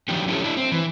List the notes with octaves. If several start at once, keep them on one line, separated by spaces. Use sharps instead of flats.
D#3 F3 F#3 D4 D#4 G4
C#4 E4 G4 A4
D4 E4
C4
E3